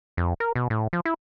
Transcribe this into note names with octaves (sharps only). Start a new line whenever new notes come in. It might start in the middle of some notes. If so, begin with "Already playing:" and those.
F2
A#4
B2
A2
F3
E4